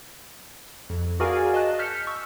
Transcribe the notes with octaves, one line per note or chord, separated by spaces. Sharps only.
F2
F#4 G#4 A#4 D5 F5 G#5
D#5 A5 F#6
A5 F6 G6 B6 C#7
C#6 E6